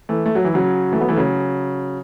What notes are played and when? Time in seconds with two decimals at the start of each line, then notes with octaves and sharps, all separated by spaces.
0.09 E3 A3
0.26 A3
0.35 F#3
0.44 E3
0.54 C#3 F#3
0.92 E3 A3
1.00 F#3 B3
1.09 E3 A3
1.17 C#3 F#3